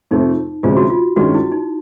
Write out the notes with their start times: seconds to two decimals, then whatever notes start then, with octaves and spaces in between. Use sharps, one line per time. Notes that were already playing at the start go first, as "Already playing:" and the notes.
0.11 F2 C3 F3 A3 C4 D#4
0.63 D2 C3 F3 G#3 C#4 F4
0.77 F#4
0.90 F4
1.16 G2 D#3 G#3 C#4 F#4
1.34 E4
1.52 D#4